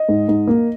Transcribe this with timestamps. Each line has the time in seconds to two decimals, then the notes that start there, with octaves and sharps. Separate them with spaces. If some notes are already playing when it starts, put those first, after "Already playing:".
Already playing: D#5
0.09 G#2
0.29 G#2
0.47 A#3